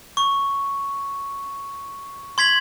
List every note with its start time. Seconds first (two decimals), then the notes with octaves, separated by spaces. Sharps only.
0.17 C#6
2.38 C6 G#6 B6 F#7